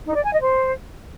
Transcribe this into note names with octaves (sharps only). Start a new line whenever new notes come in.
D#4
D5
G#5
D#5
C5